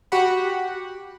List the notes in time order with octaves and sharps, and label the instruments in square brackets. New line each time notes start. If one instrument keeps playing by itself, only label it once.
[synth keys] F#4 G4 F#5 B5